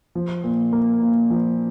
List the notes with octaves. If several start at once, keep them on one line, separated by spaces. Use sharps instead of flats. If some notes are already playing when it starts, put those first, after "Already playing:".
F3
A#2
A#3
A#2
F3